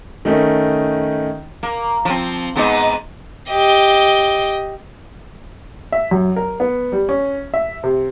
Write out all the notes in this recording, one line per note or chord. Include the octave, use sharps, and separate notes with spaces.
D#3 A3 C#4 D#4
A#3
F3 C4
G#2 B3 D#4
G4 D#5
E5
F#2
A#4
B3
G3
C#4
E5
C3